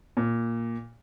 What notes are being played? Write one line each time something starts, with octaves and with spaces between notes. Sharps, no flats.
A#2